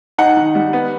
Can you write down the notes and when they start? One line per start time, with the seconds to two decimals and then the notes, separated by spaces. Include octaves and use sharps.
0.18 D#4 F#5
0.37 D#3
0.55 G3
0.73 B3